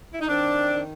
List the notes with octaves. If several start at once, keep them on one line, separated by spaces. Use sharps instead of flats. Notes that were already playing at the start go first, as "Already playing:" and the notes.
E4
D#4
D#3 C4 D4
D#3